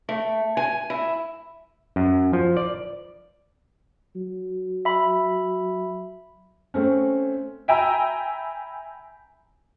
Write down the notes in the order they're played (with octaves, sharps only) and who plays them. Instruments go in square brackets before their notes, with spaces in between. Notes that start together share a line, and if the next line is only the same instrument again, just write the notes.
[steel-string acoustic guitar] A3
G#5
E4
[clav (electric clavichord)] F#2
F3
D5
[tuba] F#3
[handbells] E5 B5
[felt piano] A3 C4 C#4
[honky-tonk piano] E5 G5 G#5 A#5 B5 E6